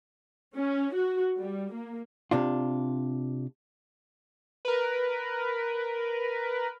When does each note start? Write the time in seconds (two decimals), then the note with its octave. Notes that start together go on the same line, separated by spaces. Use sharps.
0.55 C#4
0.94 F#4
1.38 G3
1.73 A#3
2.31 C3 D4 F4
4.65 A#4 B4